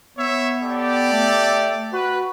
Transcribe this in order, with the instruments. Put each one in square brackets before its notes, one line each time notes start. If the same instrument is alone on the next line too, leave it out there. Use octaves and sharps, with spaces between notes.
[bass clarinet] B3 [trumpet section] C#5 E5
[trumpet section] G4 A4 D5
[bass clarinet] A3
[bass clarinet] F#4 [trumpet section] B4